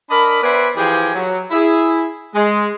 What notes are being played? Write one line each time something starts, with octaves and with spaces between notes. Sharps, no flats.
D4 A#4 D5 D#5 B5
B3 B4 C5 D5 E5 G#5
E3 F3 G4 G#4 G5 G#5
F#3
E4 G#4
G#3